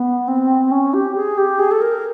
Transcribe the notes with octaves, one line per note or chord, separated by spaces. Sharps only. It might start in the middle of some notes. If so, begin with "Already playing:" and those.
Already playing: B3
C4
C#4
G4
G#4
G4
G#4
A4
A#4